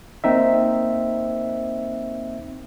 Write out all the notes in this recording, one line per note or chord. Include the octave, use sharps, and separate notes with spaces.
A#3 C4 D#4 E5